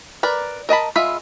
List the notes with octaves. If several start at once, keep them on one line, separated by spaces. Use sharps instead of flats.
A#4 B4 D5
A#4 D#5 A5 B5
G#3 F4 E5 B5